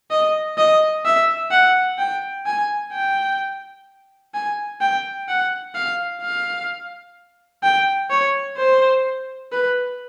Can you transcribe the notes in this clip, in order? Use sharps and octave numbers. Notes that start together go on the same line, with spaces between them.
D#5
D#5
E5
F#5
G5
G#5
G5
G#5
G5
F#5
F5
F5
G5
C#5
C5
B4